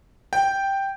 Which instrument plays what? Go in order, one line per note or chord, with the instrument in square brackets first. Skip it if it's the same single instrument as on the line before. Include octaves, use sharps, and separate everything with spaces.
[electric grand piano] G5